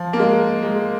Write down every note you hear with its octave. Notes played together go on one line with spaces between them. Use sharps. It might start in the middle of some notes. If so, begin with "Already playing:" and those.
Already playing: F3
A#3
G#3
G#3